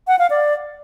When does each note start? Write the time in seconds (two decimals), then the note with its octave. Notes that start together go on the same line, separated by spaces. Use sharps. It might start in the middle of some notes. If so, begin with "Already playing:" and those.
0.07 F#5
0.19 F5
0.30 D5